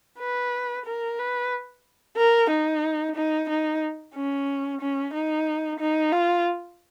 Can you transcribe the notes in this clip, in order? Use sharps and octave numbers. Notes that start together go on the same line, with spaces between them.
B4
A#4
B4
A#4
D#4
D#4
D#4
C#4
C#4
D#4
D#4
F4